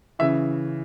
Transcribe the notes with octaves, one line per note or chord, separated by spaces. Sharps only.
C#3 E3 E5